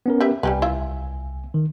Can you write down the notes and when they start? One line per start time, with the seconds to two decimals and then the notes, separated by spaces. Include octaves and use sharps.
0.06 B3 C#4 A#4
0.20 G4 B4 E5
0.43 C2 G3 G4 B4 G#5
0.62 E4 F4 E5
1.54 D#3